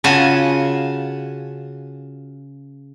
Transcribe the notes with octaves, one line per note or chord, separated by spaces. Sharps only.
C#3 F4 F#4 F#5 G#5 A5